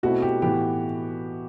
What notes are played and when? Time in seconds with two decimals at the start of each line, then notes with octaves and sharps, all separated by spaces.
0.03 B2 A3 C4 E4 F#4
0.22 G4
0.42 A2 E3 B3 E4 G4